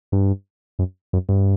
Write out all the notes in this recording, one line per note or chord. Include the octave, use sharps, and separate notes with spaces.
G2
F#2
F#2
G2